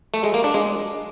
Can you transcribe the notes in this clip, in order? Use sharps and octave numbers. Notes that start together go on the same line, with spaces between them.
A3
G#3
A#3
D4
G#3